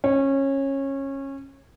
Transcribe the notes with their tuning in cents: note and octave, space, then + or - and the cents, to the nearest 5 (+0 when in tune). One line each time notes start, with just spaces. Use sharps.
C#4 -20